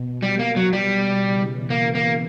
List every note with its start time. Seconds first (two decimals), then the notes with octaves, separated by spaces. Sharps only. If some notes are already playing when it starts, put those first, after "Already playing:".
Already playing: B2
0.23 G3
0.39 A#3
0.56 F#3
0.72 B2 G3
1.21 C#3 E3
1.70 A#3
1.95 A#3